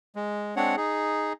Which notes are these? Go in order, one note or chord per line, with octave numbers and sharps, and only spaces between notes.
G#3
G#3 C4 D4 C#5 F#5
D#4 G#4